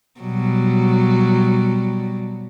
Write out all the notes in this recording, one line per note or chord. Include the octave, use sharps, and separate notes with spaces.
B2 F#3 G3